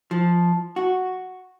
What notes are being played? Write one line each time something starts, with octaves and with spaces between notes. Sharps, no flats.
F3
F#4